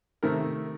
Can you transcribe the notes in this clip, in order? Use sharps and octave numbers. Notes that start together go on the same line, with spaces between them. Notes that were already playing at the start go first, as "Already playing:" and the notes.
C3 D#3 A3 A#4